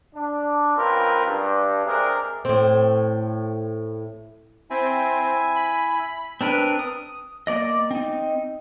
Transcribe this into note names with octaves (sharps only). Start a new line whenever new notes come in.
D4
C#2 C4 F4 A#4 B4
G2
C3 G#3 D4 G#4 A#4
A2 C4
C4 E4 E5 G#5
B5
C4 D4 A#4 B4
D#6
A#3 D5 D#5
C4 D#4